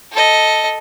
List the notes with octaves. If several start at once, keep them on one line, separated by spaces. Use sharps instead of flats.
A4 D#5